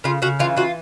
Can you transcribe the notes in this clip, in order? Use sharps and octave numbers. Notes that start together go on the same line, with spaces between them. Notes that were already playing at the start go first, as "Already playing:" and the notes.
C#3 F4
C#3 F#4
E3 F4
F4 F#4